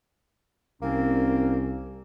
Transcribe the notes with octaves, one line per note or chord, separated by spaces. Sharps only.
C2 A#3 C4 C#4